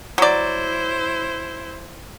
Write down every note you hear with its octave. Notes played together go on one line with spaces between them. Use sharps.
F#3 E4 C5 D5